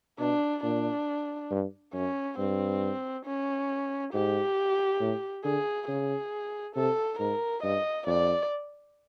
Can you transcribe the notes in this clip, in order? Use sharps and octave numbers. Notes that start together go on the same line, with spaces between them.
B2 D4
A#2 D4
G2
F#2 C#4
G2 C4
C#4
G#2 G4
A2
D3 G#4
C#3 G#4
C3 A4
G#2 A#4
G2 D#5
F2 D5